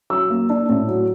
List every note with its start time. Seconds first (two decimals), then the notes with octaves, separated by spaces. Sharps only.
0.10 F#3 E6
0.30 A#3
0.50 D4
0.69 A2
0.88 F#3